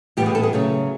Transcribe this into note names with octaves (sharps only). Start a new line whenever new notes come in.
A2 E3 G3 B3 G4
G#4
A4
G#4
C#3 F#3 A3